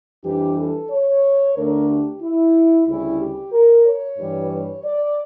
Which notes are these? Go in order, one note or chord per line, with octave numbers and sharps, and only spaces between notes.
F2 E3 G3 D4 G4
A4
C#5
D2 D3 A3 D4 A#4
G4
E4
D2 C#3 G3 C#4 E4
G4
A#4
C#5
G2 E3 G3
C#5
D5